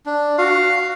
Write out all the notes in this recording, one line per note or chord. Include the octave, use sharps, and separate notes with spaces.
D4
F#4 F5